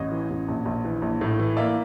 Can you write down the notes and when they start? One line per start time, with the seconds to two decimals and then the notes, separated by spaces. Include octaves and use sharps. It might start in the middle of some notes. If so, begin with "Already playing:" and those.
Already playing: A1 C#5 D#5
0.12 E3
0.30 A1
0.48 A#1
0.65 A#1
0.85 E3
1.02 A#1
1.21 A2
1.39 E3
1.57 A#3 D5 E5